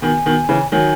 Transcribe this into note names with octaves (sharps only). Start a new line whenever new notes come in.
B2 D#3 G#5
B2 D#3
C#3 E3
D#3 F#3 G#5